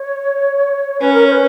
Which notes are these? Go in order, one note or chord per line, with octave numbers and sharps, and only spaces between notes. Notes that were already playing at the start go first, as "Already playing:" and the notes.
Already playing: C#5
C#4 B4
A#4
C#5
B4